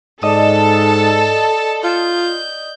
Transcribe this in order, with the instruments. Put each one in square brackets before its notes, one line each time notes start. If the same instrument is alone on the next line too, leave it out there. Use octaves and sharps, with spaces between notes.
[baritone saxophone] G#2 [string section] A4 [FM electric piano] D5 D#5 D#6 [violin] A5
[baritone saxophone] F4 [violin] G6